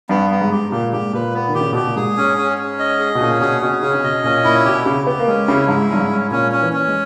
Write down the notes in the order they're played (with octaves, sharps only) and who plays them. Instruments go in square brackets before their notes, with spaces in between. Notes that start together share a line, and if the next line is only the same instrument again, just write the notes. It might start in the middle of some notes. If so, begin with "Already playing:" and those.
[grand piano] G2 [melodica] B3
[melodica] B3
[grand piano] G#2
[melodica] G4
[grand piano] A#2 [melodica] G4
[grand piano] G#2 [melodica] G4
[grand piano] A#2 [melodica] B4
[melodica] B3
[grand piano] D#3
[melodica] G4
[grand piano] C#3
[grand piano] B2 [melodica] G4
[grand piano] A#2
[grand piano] G#2 [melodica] G#4
[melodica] C#4
C#4
C#4
D#5
G#4
[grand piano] B2
[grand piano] A#2 [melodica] C#4
[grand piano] B2 [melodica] G#4
[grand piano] B2 [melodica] C#4
[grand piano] C#3 [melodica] C#4
[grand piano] C#3
[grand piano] B2 [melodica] D#5
[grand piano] A#2 [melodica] C#4
[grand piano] A#2 [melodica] E4
[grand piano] B2 [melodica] G4
[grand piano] C#3 [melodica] G4
[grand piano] B3 [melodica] G4
[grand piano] A#3
[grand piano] G#3 [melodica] C#4
[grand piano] C#3 [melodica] E4
[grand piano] G#2 [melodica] E4
[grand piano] G2 [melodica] C#4
[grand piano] G#2
[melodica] C#4
[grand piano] A#2 [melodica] C#4
[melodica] C#4
[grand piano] E3
[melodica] C#4
[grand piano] G#3